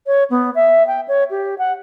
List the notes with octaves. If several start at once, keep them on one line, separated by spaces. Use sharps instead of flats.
C#5
B3
E5
G5
C#5
G4
F#5